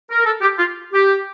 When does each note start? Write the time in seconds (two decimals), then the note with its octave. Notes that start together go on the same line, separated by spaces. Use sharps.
0.11 A#4
0.25 A4
0.42 G4
0.58 F4
0.93 G4